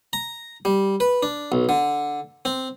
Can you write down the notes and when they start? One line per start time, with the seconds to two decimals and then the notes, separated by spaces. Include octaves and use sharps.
0.13 A#5
0.65 G3
1.00 B4
1.23 D4
1.52 B1
1.69 D3
2.45 C4